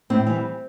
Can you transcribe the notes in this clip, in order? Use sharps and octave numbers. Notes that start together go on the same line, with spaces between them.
A2 C4
E3 G3